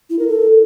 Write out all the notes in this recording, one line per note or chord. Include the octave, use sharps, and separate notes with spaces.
E4
A#4
A4